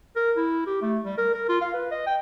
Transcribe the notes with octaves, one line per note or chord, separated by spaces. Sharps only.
A#4
E4
G4
A3
G3
A#4
A#4
F4
F5
B4
D#5
G5